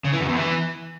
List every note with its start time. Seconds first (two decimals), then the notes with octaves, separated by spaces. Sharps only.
0.04 C#3
0.12 E3
0.20 F#2
0.29 E2
0.37 E3